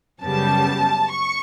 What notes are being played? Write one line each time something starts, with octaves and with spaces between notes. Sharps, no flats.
F#2 C#3 G3 B3 A5
C#6